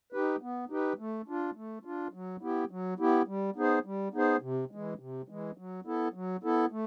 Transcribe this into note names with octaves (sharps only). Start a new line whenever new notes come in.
D#4 G4 B4
B3
D#4 G4 B4
A3
D4 F4
A3
D4 F4
F#3
B3 E4 G4
F#3
B3 E4 G4
G3
B3 D#4 G#4 C5
G3
B3 D#4 G#4 C5
C3
E3 G#3
C3
E3 G#3
F#3
B3 E4 A4
F#3
B3 E4 A4
A3